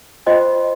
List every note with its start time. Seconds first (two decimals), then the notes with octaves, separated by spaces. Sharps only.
0.26 F4 C5 D#5 G5 C6